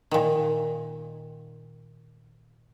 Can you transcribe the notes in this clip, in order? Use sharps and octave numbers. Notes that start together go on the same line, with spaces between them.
A#2 D#3